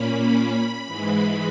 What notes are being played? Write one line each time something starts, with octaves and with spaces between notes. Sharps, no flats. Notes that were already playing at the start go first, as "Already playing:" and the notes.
Already playing: A#2 A#3 C#4 B5
G#2 E3 G#3